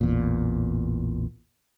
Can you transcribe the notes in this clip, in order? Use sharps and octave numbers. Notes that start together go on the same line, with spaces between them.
A1 E2 A#2